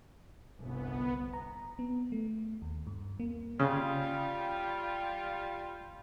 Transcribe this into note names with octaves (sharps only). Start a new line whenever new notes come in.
G1 C2 B3
A#5
B3
A3
D#2
G2
A#3
C#3 G3 F4